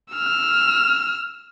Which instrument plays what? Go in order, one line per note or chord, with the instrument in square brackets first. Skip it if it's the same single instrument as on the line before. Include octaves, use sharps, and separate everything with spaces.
[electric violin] E6 F6